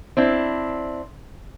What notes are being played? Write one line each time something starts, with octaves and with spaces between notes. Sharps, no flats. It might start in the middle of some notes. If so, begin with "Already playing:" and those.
C4 D4 E4